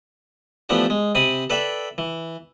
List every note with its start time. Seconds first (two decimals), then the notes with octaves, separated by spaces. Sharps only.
0.69 E3 F3 A3 B3 D4 G4
0.90 G#3
1.15 C3 C4 G#5 B5 D#6
1.50 A4 B4 D5 E5 G5
1.98 E3